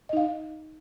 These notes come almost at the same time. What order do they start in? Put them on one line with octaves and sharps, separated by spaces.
D#5 D#4 F5